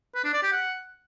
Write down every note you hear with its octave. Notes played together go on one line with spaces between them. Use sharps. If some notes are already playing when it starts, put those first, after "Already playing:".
B4
D4
D5
G4
F#5